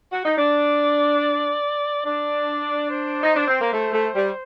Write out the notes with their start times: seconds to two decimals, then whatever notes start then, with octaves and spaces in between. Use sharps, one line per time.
0.12 F#4
0.25 D#4
0.38 D4 D5
2.05 D4 D5
2.89 C5
3.23 D#4
3.36 D4
3.48 C4
3.61 A#3
3.73 A3
3.93 A3
4.15 G3